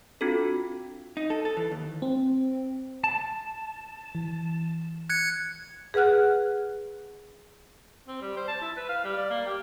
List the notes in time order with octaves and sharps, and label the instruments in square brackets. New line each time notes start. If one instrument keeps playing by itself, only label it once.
[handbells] C4 D4 F4 F#4 A4
[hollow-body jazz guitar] D#4
A4
A4
E3
D#2
[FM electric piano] C4
[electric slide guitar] A5
[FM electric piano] E3
[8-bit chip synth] F#6 G#6 C#7
[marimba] G#4 B4 F#5 F6 F#6
[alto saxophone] C4
G3
C5
A5
E4
B4
F5
G3
D5
A#3
G4